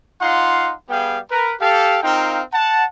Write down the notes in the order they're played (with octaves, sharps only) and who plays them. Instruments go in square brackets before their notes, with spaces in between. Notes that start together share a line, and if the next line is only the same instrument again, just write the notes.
[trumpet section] D#4 F4 F5 F#5 C6
G3 B3 G#4 F5 G5
A#4 B4
G4 A4 F5
C4 D#4 F4 A#4 F5 G5
F#5 A5